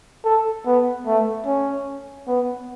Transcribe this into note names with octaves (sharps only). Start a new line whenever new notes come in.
A4
B3
A3
C#4
B3